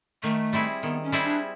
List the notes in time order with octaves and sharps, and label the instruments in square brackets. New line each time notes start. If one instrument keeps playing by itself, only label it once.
[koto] D#3 [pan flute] A3
[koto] G3 C4 E4 G#4
[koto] D#3 [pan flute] B3
[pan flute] C#4
[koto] G3 C4 E4 G#4
[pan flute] D4